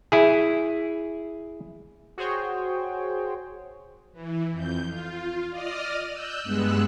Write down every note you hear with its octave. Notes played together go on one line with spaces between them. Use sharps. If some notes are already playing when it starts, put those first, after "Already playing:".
E4 G#4
F#4 G#4 C5 C#5 G5
E3
F2 G6
F4
D5 D#5 D#6 F6
E6 F#6 G6
G2 G#3 B3 E6 F#6